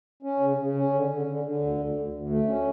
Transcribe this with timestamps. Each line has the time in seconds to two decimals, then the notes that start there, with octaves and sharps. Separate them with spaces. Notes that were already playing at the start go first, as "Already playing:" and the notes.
0.23 C#4
0.40 C#3
0.57 C#3
0.74 C#4
0.93 D3
1.09 D3
1.27 D3
1.44 D3
1.61 D2
1.78 D2
1.96 D2
2.13 D2
2.30 A3
2.47 C#4